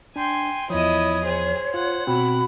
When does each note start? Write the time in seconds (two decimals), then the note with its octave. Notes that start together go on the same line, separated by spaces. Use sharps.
0.16 D4 G5 G#5 C6
0.70 E2 F3 E4 C#5 D#5 D#6
1.24 G#4 C5
1.74 F4 F#5
2.07 B2 C4 F#4 B5